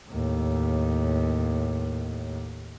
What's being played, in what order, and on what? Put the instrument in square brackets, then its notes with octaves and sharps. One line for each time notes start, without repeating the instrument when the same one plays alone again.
[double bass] D#2 A2